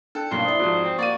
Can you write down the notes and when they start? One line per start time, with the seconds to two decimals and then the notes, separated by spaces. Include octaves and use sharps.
0.15 D4 A4 G5 F#6
0.31 B1 G2 A#3 C6
0.44 E4 C5 D5 D#6
0.59 F2 G#2 F4 F#4 D#6
0.84 C4
0.98 A#3 F#4 D5 C#6 D#7